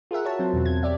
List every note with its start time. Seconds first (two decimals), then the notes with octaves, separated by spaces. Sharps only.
0.11 F4 G#4 A#4 E5 F#5
0.25 F#4 C#5 A5
0.39 F#3 C4 C5
0.53 E2 B2 C4
0.66 G#6
0.83 G4 D5 E5